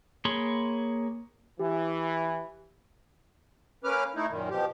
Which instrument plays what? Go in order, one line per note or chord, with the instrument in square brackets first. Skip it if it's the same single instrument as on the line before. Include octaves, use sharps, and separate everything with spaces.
[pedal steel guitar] A#3 G#4 C#5 B5 C6
[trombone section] E3 [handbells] G4
[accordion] A#3 C#4 B4 D6 F6
A3 D#4 E4
F#2 A#2 D#3
B2 F3 G4